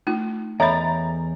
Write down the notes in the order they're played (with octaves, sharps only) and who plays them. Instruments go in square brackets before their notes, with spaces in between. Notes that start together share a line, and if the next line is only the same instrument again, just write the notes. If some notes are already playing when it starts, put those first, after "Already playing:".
[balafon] A3 F4 [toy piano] D#4
[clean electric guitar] E2 [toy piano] A4 C#5 D#5 [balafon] E5 B5 [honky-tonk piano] A#5 A6